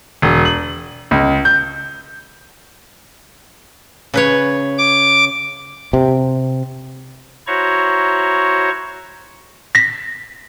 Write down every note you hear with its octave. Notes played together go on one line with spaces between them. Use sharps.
E1
F#7
C#2
G6
C#3 B4 C#5
D6
C3
E4 F#4 C5 C#5 A#5 C#6
A#6 B6